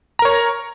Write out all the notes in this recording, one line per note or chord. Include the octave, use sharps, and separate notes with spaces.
A#4 C#5 A#5